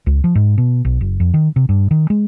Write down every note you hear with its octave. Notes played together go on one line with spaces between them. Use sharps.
C#2
F3
G#2
B2
B1
F#1
F2
D#3
C3
G2
D#3
G#3